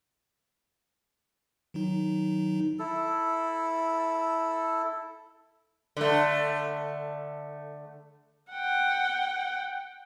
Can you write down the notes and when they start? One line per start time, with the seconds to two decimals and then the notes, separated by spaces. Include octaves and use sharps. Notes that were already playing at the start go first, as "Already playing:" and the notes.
1.74 D#3 F#3 D#4
2.79 E4 A4
5.97 D3 A3
8.52 F#5 G5